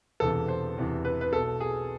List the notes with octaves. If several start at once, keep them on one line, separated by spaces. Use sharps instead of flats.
E1 E2 C3 E3 A4
C5
E1 E2 C3 E3
B4
B4
B1 B2 A4
G#4